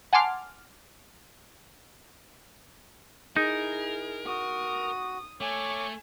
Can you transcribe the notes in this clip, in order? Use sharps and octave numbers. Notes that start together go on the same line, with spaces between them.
F#5 G#5 A5 C6 D6 F6
D#4 E4 G#4 A#4
F#4 D#6
A3 C#5 G#5 C#6 D6